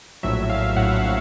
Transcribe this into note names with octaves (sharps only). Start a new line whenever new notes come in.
A#1 A2 F#3 E5
F5
A#1 A2 F#3 F#5
F5